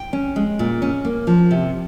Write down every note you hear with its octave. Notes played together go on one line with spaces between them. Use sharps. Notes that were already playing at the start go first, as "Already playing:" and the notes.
Already playing: G5
C#4
G#3
A#2
C#4
A#3
F3
C3